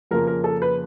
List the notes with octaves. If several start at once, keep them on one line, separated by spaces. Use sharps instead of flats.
F2 C#3 F3 A#3 A#4
A#4
A4
B4